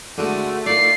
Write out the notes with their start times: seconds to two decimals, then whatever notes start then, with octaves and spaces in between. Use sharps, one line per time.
0.17 D3 G#3 A3 F#4 D5
0.66 D#4 F4 A#4 D5 C7